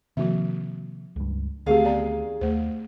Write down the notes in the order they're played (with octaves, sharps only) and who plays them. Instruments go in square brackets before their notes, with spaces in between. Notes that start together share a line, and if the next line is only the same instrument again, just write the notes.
[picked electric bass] C3 D#3 A#3 [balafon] F3 F#4 E5
[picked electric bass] C#2 G2
[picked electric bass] D2 A3 [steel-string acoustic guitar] D#3 G#4 F5 [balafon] C4 G4
[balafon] B3 D5 A#5
[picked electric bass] D#2 [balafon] A3 C5